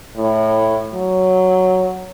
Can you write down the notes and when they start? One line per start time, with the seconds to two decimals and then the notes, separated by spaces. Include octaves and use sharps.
0.17 A2
0.93 F#3